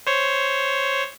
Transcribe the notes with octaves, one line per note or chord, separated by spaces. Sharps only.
C5 C#5